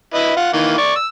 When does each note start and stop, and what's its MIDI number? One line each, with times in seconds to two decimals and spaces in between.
0.14 0.33 64
0.14 0.33 71
0.14 0.33 75
0.37 0.52 65
0.37 0.52 78
0.53 0.75 51
0.53 0.75 52
0.53 0.75 58
0.78 0.92 74
0.78 0.92 85
0.95 1.06 88